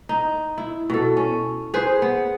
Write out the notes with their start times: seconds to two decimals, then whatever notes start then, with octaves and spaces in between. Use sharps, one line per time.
0.09 D#4
0.58 E4
0.90 B2 A4
1.17 C#4
1.74 G#4 B4 C5
2.02 B3